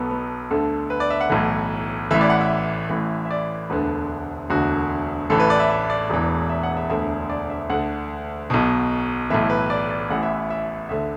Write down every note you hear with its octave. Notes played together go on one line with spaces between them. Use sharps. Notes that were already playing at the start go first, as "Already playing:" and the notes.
Already playing: B1 B2 B3 A4
B3
D2 D3 A4
B4
D5
E5
F#5
B1 A2 E3
A1 A2 E3 E5
D5
F#5
E5
A1 A2 E3
E5
D5
E1 D2 D3 B4
E1 D2 D3 F#4
A1 A2 E3 A4
B4
D5
E5
E5
D5
E1 E2 E3
E5
F#5
E5
E1 D2 D3 E5
D5
E5
D2 D3 F#5
B1 B2
B1 A2 E3 E5
B4
D5
D5
A1 A2 E3 F#5
E5
E5
D2 D3 E5